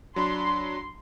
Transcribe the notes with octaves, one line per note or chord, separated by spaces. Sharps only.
F#3 D4 B5 C6